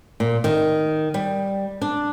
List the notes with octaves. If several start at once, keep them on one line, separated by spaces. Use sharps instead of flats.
A#2
D#3
G3
D4